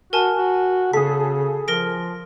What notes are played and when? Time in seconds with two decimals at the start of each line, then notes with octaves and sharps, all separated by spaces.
0.13 F#4 A#4 G#5 A5
0.38 F#4
0.93 C#3 G#4 A4 B6
1.68 F3 A#4 A#6 D7